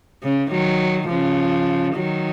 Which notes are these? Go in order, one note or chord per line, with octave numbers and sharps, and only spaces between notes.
C#3
D#3 F#3
C#3 F3
D#3 F#3